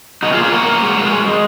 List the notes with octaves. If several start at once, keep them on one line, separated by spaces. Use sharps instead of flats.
B2 D#4 F#4
F4 G#4
A#3
F4 G#4
A#3 F#4 A#4
A#3
G#3
G#3
G#3
G#3